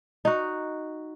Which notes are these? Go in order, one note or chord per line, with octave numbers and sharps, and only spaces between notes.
D#4 F#4